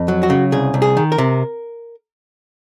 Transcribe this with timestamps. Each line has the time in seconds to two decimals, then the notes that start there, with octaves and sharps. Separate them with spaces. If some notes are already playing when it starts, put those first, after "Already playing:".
Already playing: F2
0.08 F#3
0.23 F#4
0.30 C#3
0.52 C2 G#4
0.74 C2
0.82 G#4
0.97 D#3
1.12 A#4
1.18 C3